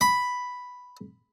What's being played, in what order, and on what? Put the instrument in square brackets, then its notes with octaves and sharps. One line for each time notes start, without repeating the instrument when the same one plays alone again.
[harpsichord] B5